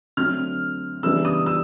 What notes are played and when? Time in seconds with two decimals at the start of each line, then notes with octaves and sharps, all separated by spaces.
0.17 D3 F#3 A3 C4 F6
1.03 C#3 E3 G3 B3 D4 E6
1.25 D#6
1.46 E6